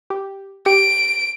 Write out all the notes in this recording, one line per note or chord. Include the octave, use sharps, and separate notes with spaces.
G4
G4 D7